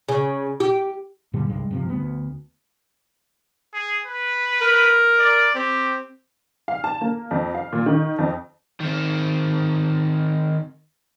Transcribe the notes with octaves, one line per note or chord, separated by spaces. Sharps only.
C#3
G4
G2 A#2 D3 G3
C2 G2 G#3
G2 C3 F3
D2 B3
G#4
B4
A#4
D5
C4 G4
F5
A5
A#3
F2
F5
A#2
D#3
F2
D#3 C4